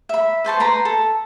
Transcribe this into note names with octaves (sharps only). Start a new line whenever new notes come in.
E5 B5
B4 C5 A5 C#6
B4 G5 A#5 C6
A4